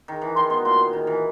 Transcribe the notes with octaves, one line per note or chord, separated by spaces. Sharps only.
D#3
E3
D#3 C6
B2 C6
A#2 C6
D#3
E3